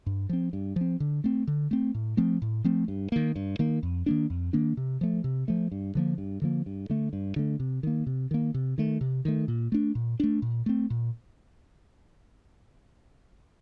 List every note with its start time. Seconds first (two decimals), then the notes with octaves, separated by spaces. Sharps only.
0.06 G2
0.29 F3 C4
0.53 G2
0.76 F3 C4
1.00 D3
1.24 A3 C4
1.47 D3
1.71 A3 C4
1.94 A2
2.17 F3 A3 C4
2.42 A2
2.64 F3 A3 C4
2.88 G2
3.12 D#3 A#3
3.36 G2
3.59 D#3 A#3
3.83 F2
4.06 D#3 A#3 D4
4.30 F2
4.53 D#3 A#3 D4
4.77 C3
5.01 F3 A3
5.24 C3
5.48 F3 A3
5.71 G2
5.95 D3 F3 A#3
6.18 G2
6.42 D3 F3 A#3
6.66 G2
6.90 D3 A3
7.13 G2
7.36 D3 A3
7.60 C3
7.83 D#3 A#3
8.06 C3
8.31 D#3 A#3
8.54 C3
8.78 D#3 A3
9.01 C3
9.25 D#3 A3
9.48 A#2
9.72 A3 D4
9.95 A#2
10.20 A3 D4
10.42 A#2
10.66 A3 C4
10.90 A#2